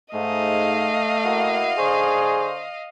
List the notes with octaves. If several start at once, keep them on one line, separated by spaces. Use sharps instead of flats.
G#2 A3 D#5 F5
A#3 E4 F#4
D3 G#4 C5 C#6